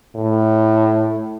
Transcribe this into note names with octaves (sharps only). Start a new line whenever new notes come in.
A2